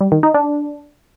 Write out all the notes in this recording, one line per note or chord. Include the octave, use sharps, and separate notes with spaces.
G3
D#3
D#4
D4